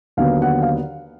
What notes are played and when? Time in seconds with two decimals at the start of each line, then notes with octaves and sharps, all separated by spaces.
0.17 D#2 D3 F#3 B3 F5
0.42 F#5
0.62 F5